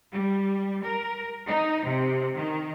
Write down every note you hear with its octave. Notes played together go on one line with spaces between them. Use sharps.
G3
A#4
D#4
C3
D#3